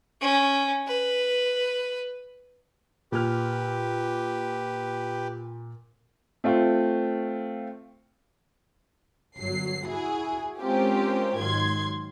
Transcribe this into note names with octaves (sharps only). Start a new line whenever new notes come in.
C#4
B4
A#2 G4 B4 F6
A3 C4 F4
G1 F#3 C7
E4 F#4 G#4
G#3 C4 C#4 F4 G4 A#4
G#2 D#3 F#3 C6 G#6